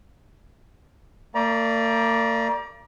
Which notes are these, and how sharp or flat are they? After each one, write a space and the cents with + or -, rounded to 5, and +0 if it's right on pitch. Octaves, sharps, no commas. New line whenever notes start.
A#3 -45 D5 +0 A#5 +35